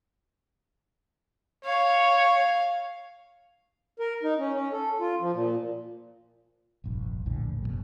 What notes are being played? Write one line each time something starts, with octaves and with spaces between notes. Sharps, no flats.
C#5 F5
A#4
D#4
C#4
C#4
A4
F4
F3
A#2
F1 A#1 G2
A#1 E2 A2 D3
F#1 D#2 B2 F#3